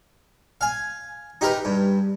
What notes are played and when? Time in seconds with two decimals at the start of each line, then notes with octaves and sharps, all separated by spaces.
0.61 F5 G#5
1.41 D#4 G4 A#4 B4
1.65 G2